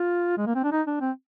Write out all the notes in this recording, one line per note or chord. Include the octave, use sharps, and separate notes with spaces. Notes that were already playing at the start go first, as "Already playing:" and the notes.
Already playing: F4
G#3
A#3
C4
D4
D#4
D4
C4